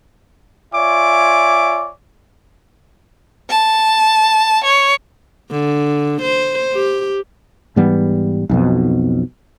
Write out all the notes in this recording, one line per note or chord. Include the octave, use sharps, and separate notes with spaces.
F4 C#5 D5 E5 G#5 D6
A5
C#5
D3
C5
G4
G#2 E3 G3 B3
B1 F2 B2